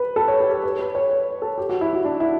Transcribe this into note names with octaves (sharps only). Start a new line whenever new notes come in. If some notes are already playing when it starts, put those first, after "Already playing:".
Already playing: B4
A4
C#5
G4
A4
B4
B4
C#5
C#5
A4
G4
F#4
E4
F#4
D4
E4